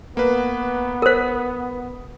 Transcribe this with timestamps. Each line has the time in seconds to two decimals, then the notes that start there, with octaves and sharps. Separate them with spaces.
0.17 A#3 B3 B4
1.02 A#4 C5 D#6 B6